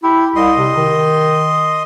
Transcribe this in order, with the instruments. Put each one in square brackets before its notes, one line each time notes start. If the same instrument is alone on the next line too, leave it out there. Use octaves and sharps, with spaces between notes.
[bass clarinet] E4 [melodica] G4
[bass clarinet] C2 [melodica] D#5 C6
[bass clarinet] C3
D#3